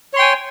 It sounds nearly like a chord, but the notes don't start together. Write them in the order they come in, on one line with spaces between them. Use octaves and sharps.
C#5 C6 G5 G#5